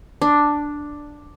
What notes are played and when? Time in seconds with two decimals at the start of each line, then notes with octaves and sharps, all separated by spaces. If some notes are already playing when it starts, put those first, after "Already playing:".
0.22 D4